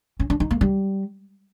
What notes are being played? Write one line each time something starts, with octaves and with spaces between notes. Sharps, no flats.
C#4
D4
D#4
A#3
G3